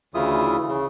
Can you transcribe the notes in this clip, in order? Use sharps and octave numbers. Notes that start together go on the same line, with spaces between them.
D2 C#3 E3 E4 F4 D#6
C#3